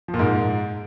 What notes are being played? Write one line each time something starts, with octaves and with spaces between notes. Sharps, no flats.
F3
A#2
G#2